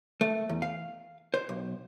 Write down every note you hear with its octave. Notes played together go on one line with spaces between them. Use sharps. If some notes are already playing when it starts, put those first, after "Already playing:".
A3
E2
F5
C5
B1